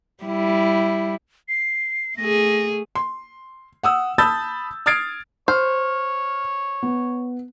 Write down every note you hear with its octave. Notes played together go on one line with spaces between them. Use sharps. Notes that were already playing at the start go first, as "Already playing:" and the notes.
G3 E4
C7
A3 G#4 A#6
C6
F#5 D#6 E6
A5 B5 D#6 E6 G6 A6
D#6 F6 G#6 A6 C7 D7
C5 C#5 F6
B3